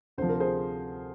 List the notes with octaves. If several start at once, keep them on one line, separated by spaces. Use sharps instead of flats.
D2 C3 F3 C5
A#4
G#4 C5